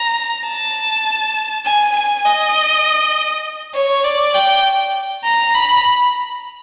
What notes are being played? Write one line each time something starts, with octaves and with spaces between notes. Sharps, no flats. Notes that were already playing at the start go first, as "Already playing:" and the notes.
Already playing: A#5
A5
G#5
G#5
D#5
C#5
D5
G5
A#5
B5